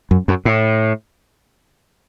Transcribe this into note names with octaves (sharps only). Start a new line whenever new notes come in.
F#2
F#2
A2